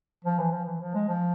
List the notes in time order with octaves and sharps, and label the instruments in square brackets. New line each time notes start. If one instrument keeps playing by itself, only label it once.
[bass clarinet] F3
E3
F3
E3
F3
G#3
F3